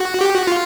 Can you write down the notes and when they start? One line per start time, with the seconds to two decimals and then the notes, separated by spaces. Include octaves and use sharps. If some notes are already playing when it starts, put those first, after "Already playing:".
Already playing: F#4
0.21 G4
0.34 F#4
0.47 F4